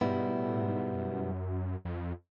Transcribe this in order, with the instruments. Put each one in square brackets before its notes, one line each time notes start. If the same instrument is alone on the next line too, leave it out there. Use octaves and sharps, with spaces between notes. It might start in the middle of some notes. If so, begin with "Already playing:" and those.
[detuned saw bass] G#2 [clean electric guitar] B2 G3 B3 E4
[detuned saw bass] G2
G#2
A2
G#2
F#2
F2